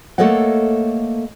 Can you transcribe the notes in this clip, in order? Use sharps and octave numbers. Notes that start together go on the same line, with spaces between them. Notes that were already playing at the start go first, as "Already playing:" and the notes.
A3 A#3 A4 C#5 D#5 F#5